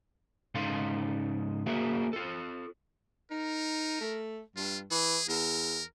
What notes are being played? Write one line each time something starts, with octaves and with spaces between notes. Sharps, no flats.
G#2 C#3 D#4 A4 F5 C6
A#3 F#4 G#4 A#4 C5 E5
F4 A4
D#4 A#4
A3
G2 F4
E3 G#4
E2 A#4